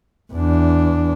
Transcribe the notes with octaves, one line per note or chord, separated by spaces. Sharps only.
E2 D4